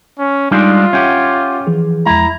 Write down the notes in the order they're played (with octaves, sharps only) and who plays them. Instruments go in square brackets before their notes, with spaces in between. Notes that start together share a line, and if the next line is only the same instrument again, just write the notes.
[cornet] C#4
[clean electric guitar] G3 G#3 D4 [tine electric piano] D#4 [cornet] F4
[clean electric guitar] C#4 G4 [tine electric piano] E5 F#5 D6
[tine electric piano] E3 F3 G#4
[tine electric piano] E2 F3 G#3 [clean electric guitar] E4 [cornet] A#5